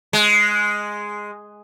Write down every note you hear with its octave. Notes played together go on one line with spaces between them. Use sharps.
G#3